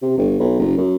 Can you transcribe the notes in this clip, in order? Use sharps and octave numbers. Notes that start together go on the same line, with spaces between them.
C3
G1
B1
F#1
F#2